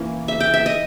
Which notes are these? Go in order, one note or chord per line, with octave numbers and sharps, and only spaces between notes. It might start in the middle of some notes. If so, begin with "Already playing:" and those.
Already playing: E3 A#3 C#4
E5
G5
E5
D#5